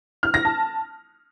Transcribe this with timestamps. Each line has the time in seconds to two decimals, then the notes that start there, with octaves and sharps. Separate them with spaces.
0.23 F6
0.34 A#6
0.45 A5